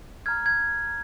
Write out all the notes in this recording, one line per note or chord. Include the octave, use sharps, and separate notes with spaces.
A#5 F6 G#6
G#6
A#5